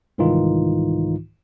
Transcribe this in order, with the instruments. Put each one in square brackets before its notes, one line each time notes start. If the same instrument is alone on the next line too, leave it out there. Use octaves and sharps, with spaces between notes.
[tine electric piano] C2 G#2 D#3 E3 D#4 F4